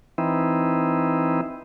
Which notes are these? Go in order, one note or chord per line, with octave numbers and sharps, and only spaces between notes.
E3 C4 D#4 E4